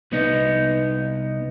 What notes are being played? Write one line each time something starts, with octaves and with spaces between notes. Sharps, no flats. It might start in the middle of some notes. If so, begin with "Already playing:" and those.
C2 B3 D#4